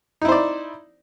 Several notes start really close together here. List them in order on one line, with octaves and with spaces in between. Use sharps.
D#4 E4 C5 D5